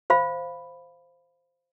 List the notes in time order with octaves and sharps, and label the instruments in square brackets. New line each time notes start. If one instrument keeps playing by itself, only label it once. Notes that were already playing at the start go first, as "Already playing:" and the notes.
[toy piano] C5 F5 B5